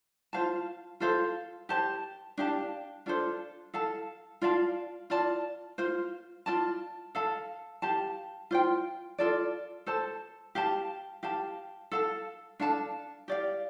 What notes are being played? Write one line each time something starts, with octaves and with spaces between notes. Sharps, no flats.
F4 C5 F5 A5
F4 A4 C5 F5
G4 C5 A5
D4 G4 F5 A5
D4 F4 A4 C5
A4 F5 A5
F4 D5 F5 A5
F4 D5 A5
F4 C5 F5
F4 D5 A5
A4 F5 A5
G4 F5 A5
F4 C5 G5
F4 A4 D5
A4 C5 A5
G4 F5 A5
G4 F5 A5
A4 F5 A5
D4 A4 F5 A5
G4 D5 F5